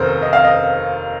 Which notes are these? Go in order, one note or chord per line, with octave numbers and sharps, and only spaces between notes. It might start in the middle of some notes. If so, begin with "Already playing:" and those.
Already playing: F1 D#2 A4 A#4 C5
D#5
F5
D#5